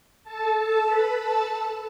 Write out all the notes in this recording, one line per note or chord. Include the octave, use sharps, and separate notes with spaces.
A4 A5
A4 A5
B4 B5
A4 A5